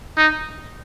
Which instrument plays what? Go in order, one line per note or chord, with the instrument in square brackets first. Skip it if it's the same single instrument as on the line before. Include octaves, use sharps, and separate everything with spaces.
[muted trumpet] D#4